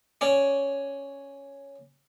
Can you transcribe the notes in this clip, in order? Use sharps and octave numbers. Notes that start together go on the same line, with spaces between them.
C#4 C#5 D5